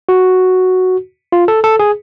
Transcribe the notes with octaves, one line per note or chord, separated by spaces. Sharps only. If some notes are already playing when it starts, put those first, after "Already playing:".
F#4
F4
A4
A4
G#4